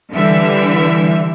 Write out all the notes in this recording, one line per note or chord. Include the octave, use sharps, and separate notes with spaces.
D3 E3 G3 E5